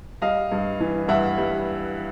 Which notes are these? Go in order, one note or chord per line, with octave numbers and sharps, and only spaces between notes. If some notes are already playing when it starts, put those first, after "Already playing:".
G3 D#5 F5
G2
E3
G2 E5 F#5
G3